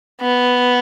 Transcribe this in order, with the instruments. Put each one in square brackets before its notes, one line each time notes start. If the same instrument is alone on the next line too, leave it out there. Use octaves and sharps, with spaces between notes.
[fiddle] B3